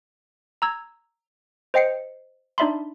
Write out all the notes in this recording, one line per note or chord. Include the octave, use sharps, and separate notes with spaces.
A#5 E6 G#6
C5 D#5 G5 C7 C#7
D4 D#4 D5 E5 B5 C6